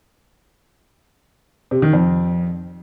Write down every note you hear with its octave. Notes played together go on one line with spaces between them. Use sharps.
C3
D#3
F2